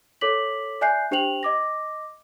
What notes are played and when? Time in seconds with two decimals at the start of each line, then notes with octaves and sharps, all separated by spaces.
0.21 A4 C#5 D6 B6 F#7
0.81 D5 E5 G#5 F#6 G6 C7
1.11 D4 G4 C5 G5 F7 F#7
1.43 D#5 D6 A#6